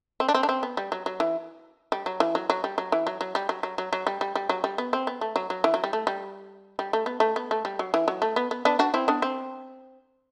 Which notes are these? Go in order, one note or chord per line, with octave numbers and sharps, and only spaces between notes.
C4
D4
C4
D4
C4
B3
G3
F#3
F#3
E3
G3
F#3
E3
F#3
F#3
G3
F#3
E3
F#3
F#3
G3
F#3
F#3
F#3
F#3
G3
G3
G3
F#3
G3
B3
C4
B3
A3
F#3
F#3
E3
F#3
G3
A3
G3
G3
A3
B3
A3
B3
A3
G3
F#3
E3
F#3
A3
B3
B3
B3 D4
D4 F#4
C4 E4
B3 D4
C4